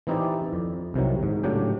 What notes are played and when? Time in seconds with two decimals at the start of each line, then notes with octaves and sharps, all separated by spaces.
0.07 E3 C4 D#4 E4 G4 D5
0.53 F2
0.94 C2 C3 D#3 F#3
1.23 G#2
1.43 A2 C#3 F#3 D4 G4 G5